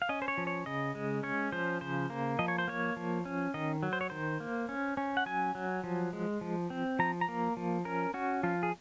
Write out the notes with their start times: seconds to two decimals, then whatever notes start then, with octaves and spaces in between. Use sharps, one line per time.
0.02 F5
0.09 C#4 D#5
0.22 C5
0.28 C#5
0.38 F3
0.47 C#5
0.66 C#3 D#5
0.95 G#3
1.23 C#4 C#5
1.52 F3 C5
1.81 C#3 C5
2.10 A#3
2.39 F3 D#5
2.48 C#5
2.58 C5
2.68 A#3 C#5
2.96 F3
3.25 C#4
3.54 D#3 D#5
3.83 F#3
3.93 C5
4.01 C#5
4.10 D#3 C5
4.40 A#3
4.69 C#4
4.97 C#4
5.17 F#5
5.26 F#3 G#5
5.55 F#3
5.84 F3
6.13 G#3
6.41 F3
6.70 C4
6.99 F3 A#5
7.21 A#5
7.28 A#3
7.57 F3
7.85 C#4 A#4
8.14 C#4 F#4
8.43 F3 F4
8.63 G#4